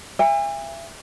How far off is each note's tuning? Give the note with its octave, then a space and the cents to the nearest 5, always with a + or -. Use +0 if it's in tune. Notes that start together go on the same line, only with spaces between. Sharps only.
E5 +25 G#5 -40